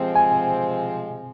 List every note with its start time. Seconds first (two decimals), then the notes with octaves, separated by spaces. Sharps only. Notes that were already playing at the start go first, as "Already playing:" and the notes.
Already playing: C3 F3 G#3 C4
0.15 G#5